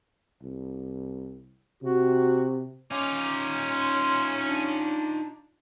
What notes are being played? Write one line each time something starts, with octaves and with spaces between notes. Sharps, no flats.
C2
C3 F#4
C#4 D#4 F4 D6
C6
D4